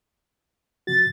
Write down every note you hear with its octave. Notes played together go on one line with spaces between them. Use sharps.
C3 F3 F#4 A6